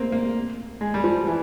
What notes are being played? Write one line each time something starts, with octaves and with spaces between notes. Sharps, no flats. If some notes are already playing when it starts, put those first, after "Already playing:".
Already playing: A#3 C4
A#3
G#3
G3
F3
E3